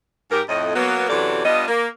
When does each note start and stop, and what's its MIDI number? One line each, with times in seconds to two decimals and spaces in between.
0.31 0.42 44
0.31 0.42 67
0.31 0.42 70
0.49 0.72 41
0.49 0.72 45
0.49 0.72 75
0.76 1.09 54
0.76 1.09 58
0.76 1.09 59
1.09 1.44 42
1.09 1.44 48
1.09 1.44 52
1.09 1.44 54
1.09 1.44 69
1.09 1.44 74
1.45 1.65 55
1.45 1.65 59
1.45 1.65 62
1.45 1.65 65
1.45 1.65 75
1.68 1.87 58